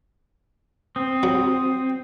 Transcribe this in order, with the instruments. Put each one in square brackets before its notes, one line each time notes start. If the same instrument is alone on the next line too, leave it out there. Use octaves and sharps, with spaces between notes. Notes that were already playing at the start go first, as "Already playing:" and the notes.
[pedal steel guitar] C4 [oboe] D#6
[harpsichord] F#3